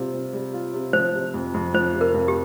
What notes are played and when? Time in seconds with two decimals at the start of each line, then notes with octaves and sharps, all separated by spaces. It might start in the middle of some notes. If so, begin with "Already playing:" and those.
Already playing: C3 G3 C4 F4
0.13 C4
0.33 G3
0.54 F4
0.73 C3
0.93 F3 C5
1.14 C3
1.34 F2
1.54 F2
1.74 F3 C5
1.94 C3
2.01 A#4
2.14 F2
2.28 G4